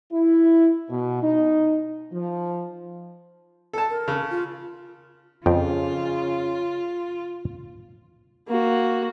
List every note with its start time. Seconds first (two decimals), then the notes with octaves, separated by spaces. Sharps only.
0.12 E4
0.89 B2
1.22 D#4
2.12 F3
3.73 A4 A5
3.90 A#4
4.08 C#3
4.30 F4
5.46 F2 C#3 F4 G5
8.48 A#3 F#4